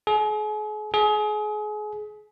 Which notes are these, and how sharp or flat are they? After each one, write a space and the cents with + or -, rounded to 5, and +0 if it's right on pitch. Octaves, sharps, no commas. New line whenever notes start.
G#4 +40
G#4 +30